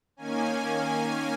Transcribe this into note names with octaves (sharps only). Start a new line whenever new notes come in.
D#3 A#3 C#4 G#5